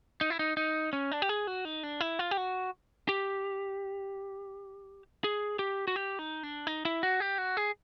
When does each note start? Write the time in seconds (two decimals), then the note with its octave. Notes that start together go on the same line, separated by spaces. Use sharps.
0.21 D#4
0.30 E4
0.39 D#4
0.57 D#4
0.93 C#4
1.12 D4
1.22 G4
1.29 G#4
1.47 F#4
1.65 D#4
1.83 D4
2.00 E4
2.19 F4
2.31 G4
2.37 F#4
3.09 G4
5.24 G#4
5.59 G4
5.88 F#4
5.96 G4
6.19 D#4
6.43 D4
6.67 D#4
6.85 E4
7.03 F#4
7.20 G4
7.38 F#4
7.57 G#4